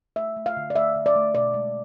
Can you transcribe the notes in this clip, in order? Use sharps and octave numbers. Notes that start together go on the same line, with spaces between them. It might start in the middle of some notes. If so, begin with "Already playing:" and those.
A3 E5
A3
F5
D3
D5
A3 E5
D3
D5
A3
B2 D5
G#3